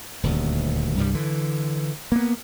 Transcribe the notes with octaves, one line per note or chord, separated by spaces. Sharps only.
D#1 D2
C2 G2 F#3 G3
D3 E3
A#3 B3